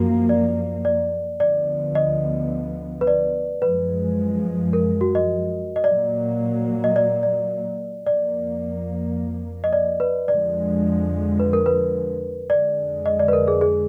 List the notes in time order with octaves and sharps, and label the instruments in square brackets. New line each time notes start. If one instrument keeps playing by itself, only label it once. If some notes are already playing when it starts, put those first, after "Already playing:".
Already playing: [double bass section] F#2 F3 A#3 [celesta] F#4
[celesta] D5
D5
[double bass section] D2 D3 F3 B3 [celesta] D5
[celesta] D#5
B4
D5
[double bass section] F#2 F3 G#3 [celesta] B4
[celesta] A#4
F#4
D#5
D#5
[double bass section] A#2 F#3 A#3 [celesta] D5
[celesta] D#5
D5
D5
[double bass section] F2 F3 A#3 [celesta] D5
[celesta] D#5
D5
B4
[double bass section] F2 D3 F3 G#3 [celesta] D5
[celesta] B4
A#4
B4
[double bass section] F2 D3 G#3 [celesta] D5
[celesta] D#5
D5
B4
A#4
G#4
G#4